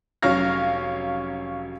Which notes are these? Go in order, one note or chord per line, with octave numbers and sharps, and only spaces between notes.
F1 F#3 C#4 F5 F6 A#6